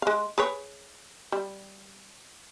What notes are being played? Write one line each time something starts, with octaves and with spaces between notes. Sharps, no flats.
G#3 F5
G#4 B4 C#5
G3